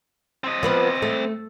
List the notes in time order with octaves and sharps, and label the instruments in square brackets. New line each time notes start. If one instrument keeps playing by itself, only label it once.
[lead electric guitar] C4 D#5
[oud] F3 B3 B4
A3